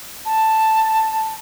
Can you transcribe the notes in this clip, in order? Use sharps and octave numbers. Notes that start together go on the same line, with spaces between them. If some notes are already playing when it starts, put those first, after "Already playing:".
A5